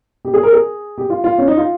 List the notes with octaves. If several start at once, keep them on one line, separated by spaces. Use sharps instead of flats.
G4
G#4
A#4
G#4
G4
F4
F4
C#4
D#4
F4